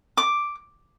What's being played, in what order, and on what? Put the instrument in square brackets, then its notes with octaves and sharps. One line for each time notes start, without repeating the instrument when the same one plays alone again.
[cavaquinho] D6